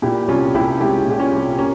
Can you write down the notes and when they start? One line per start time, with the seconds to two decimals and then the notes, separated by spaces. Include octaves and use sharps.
0.02 A#2 E4 G4
0.28 C2 C#4 F4
0.55 C2 E4 G4
0.80 G#3 E4 G4
1.06 A#2
1.11 G4
1.19 C#4 F4
1.33 C2
1.58 A#3 C#4